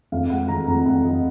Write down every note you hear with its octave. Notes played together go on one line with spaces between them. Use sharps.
F2 F5
G#3 F#5
F2 A#5
F2 A#5
F2 F#5
F2 D#5